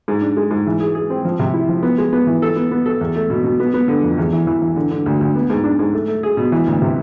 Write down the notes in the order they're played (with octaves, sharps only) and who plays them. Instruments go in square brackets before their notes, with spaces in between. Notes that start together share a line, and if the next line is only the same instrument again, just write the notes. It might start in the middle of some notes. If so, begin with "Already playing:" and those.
[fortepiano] G#2
D4
G#3
G#2
E3
G#4
G#4
C4
F3
C3
E4
F3
B3
G#3
B3
E3
A4
B3
B3
A4
E2
A3
B2
B2
B3
B3
D3
F2
E2
E3
E3
E3
D3
D3
D2
D2
B3
G#2
D4
G#2
A3
A3
G#4
B2
E3
D2
C3